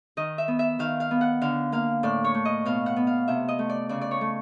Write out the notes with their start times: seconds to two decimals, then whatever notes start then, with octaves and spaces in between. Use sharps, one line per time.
0.17 D#3 D#5
0.38 E5
0.48 B3
0.59 E5
0.79 D#3 F5
1.00 F5
1.11 B3
1.21 F#5
1.41 D3 F5
1.72 A#3 F5
2.03 A2 D5
2.24 C#5
2.34 A3
2.45 D#5
2.65 B2 F5
2.86 F#5
2.96 B3
3.07 F5
3.28 C3 E5
3.48 D#5
3.59 A3
3.69 D5
3.89 C#3 D5
4.01 D5
4.11 C#5
4.21 A3